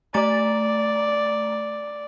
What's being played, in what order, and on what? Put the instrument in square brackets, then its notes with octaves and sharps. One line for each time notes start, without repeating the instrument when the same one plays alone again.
[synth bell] A3 A#5 A6 [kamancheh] D5